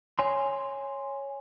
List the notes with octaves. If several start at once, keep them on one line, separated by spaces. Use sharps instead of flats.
C#5 G#5 C6